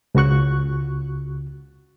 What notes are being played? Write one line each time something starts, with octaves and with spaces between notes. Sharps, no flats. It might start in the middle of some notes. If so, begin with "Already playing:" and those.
C#2 C#3 F#4 C#6 F#6